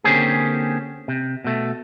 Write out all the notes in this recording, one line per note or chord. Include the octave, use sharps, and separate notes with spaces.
D3 A#3 C4 C#4 G4 G#4
C3
B2 A3